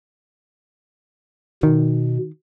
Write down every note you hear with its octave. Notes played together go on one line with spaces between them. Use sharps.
B2 D#3